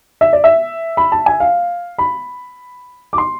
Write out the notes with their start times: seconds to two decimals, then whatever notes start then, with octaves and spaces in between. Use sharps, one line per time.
0.21 E5
0.33 D5
0.44 E5
0.97 B5
1.12 A5
1.26 G#5
1.40 F5
1.98 B5
3.13 D6
3.18 C6